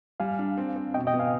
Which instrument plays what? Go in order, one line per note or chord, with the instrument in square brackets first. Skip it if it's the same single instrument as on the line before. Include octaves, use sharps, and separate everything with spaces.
[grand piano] G3 [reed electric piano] F5 G#5
[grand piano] D4
C4
C4
[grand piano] B2 [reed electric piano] D#5 G5
[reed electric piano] D#5 G5
[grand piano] B3
[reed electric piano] F5 G#5